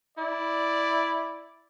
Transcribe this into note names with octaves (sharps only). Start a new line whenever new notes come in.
E4 D5